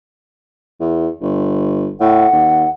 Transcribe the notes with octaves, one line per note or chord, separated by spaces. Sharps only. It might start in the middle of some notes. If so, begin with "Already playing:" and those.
E2
G1
A2 F#5
D#2